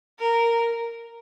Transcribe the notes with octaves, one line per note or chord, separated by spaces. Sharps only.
A#4